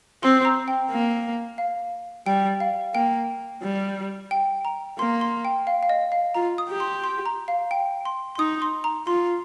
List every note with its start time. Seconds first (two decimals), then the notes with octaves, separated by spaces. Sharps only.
0.23 C4 C6
0.45 A#5
0.68 G5
0.91 A#3
1.58 F5
2.26 G3 G5
2.60 F5
2.95 A#3 G5
3.62 G3
4.31 G5
4.65 A#5
4.99 A#3 C6
5.21 C6
5.45 G5
5.67 F5
5.83 F5
5.89 D#5
6.12 F5
6.35 F4 A#5
6.58 D#6
6.69 G4
6.80 C6
7.04 C6
7.26 A#5
7.48 F5
7.71 G5
8.05 C6
8.35 C6
8.39 D#4 D#6
8.62 C6
8.84 A#5
9.07 F4 C6